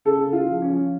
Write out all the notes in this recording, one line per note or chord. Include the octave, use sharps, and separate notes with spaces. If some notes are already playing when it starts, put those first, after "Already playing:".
C#3 A4
C#3
F4
F3
C#4
F3